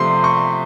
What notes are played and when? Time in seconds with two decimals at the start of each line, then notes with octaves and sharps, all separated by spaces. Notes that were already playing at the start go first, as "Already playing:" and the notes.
Already playing: C3 F3 A3 C6
0.24 C#6